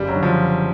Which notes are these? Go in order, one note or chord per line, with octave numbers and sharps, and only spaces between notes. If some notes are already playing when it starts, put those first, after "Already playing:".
Already playing: F#1 G3
F#3
D3
F3